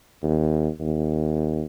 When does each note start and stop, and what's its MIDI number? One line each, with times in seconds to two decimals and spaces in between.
0.22 0.68 39
0.80 1.64 39